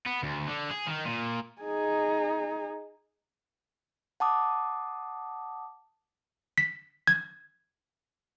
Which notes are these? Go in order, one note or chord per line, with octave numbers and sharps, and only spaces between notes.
B3
D2
D3
G#4
D#3
A#2
D#4 G#4
F#5 A5 D6 D#6
B6
G#6